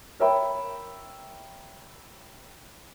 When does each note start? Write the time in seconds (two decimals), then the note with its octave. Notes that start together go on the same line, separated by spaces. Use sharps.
0.20 A#4 C#5 E5 G5 B5